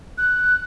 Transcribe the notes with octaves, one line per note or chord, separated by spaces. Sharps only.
F#6